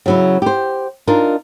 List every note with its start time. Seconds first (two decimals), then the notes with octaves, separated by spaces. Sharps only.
0.06 C#3 F#3 E4
0.42 G4 C5
1.07 D4 D#4 F4 A#4